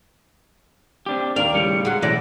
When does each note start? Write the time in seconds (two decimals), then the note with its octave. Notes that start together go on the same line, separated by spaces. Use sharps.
1.06 C4 D4 G4
1.36 D#2 D4 A#4 D5 F5 F7
1.54 A2 C#3 G3 C#7
1.85 F#3 G#3 F#5
2.02 B2 E3 F#3 A3 D5 A#6